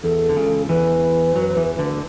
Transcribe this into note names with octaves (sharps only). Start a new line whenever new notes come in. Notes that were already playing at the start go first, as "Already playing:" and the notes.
E2 A4
D3
C#2 C#3
E2 E3 B4
F#2 F#3
E2 E3
D2 D3